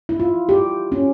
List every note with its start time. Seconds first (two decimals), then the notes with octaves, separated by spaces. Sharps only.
0.09 E4
0.20 F4
0.49 G4
0.92 C#4